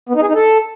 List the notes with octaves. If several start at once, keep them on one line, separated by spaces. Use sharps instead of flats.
B3
D#4
G#4
D#4
A4